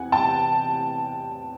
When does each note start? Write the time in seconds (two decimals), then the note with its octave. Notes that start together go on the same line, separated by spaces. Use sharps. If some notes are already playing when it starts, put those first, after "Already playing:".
Already playing: E2 C3 F#5 G#5
0.12 G5 A5